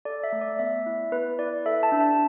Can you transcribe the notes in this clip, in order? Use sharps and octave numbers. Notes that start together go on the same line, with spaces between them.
A4 D5
E5
A3
D5
B3 E5
E4
B3 B4
E4 D5
A4 E5
A5
D4
A5